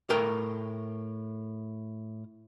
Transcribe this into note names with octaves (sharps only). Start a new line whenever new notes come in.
A2 A3 A#4 G5